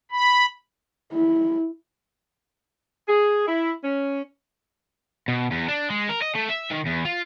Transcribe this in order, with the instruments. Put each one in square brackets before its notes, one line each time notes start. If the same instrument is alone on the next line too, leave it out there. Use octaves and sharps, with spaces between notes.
[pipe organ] B5
[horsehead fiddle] E4
[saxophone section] G#4
E4
C#4
[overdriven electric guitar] B2
E2
D4
G#3
A#4
D#5
A3
E5
D#3
E2
F4